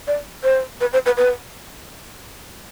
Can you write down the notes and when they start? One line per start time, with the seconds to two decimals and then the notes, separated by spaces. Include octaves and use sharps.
0.07 D5
0.44 C5
0.81 B4
0.93 C5
1.06 B4
1.17 B4